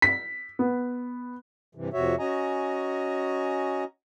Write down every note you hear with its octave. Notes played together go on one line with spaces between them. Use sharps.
B6
B3
G2 C3 E3
F2 C3 F#4 C#5 E5
C#4 F#4 D#5 G#5 A#5